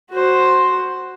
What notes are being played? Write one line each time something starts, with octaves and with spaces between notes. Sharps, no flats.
F#4 C5